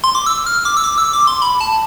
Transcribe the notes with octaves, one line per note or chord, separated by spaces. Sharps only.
C6
D6
E6
F6
D6
E6
D6
E6
D6
C6
B5
A5